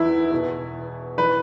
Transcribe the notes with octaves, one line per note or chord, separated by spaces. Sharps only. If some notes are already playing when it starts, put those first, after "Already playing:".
Already playing: E2 E3 E4
E2 B2
E3 B4